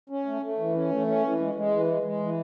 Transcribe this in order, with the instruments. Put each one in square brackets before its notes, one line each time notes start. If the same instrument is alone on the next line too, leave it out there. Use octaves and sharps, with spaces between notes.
[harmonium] C#4
A3
A3
E3
C#4
A3
C#4
E3
G#3
G#3
E3
G#3
G#3
E3